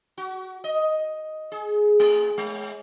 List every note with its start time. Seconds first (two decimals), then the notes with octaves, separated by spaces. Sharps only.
0.18 F#4
0.64 D#5
1.52 G#4
2.00 A3
2.38 G#3